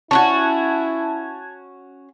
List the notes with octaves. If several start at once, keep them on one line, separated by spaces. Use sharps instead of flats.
C#4 D#4 E4 F#4 A5 F#6 G#6